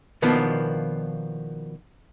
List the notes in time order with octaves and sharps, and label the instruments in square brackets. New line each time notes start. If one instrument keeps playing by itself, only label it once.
[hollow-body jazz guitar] B2 D#3 F3 A#3 B3 D4